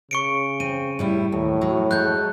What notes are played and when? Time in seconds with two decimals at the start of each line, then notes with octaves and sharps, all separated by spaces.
0.11 C#3 C#6 C#7 D7
0.60 C4 D#7
0.99 A2 G3 E4
1.32 D#2 A2
1.61 F#3
1.91 F#3 G#3 A4 F#6 G6